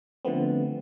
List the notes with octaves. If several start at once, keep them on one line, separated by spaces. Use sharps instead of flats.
D3 F3 A3 B3 C4